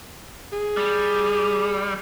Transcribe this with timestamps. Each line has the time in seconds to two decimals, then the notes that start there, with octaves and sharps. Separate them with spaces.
0.53 G#4
0.77 G3